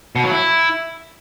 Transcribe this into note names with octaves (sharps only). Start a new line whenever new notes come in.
B2
F#3
E4